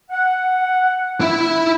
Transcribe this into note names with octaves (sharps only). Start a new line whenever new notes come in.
F#5
E4 E5